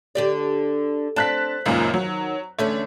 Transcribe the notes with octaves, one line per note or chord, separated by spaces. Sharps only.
D3 G4 D5
C4 D4 A5 F#6 B6
C#2 F#2 A#2 D#3
F#3
E2 D3 A3 C#4